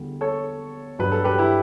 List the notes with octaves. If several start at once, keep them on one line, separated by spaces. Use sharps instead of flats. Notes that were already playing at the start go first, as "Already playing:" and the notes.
Already playing: E2 D3 G3
A4 C#5
G2 F#3 B4
A4
G4 B4
E4 G4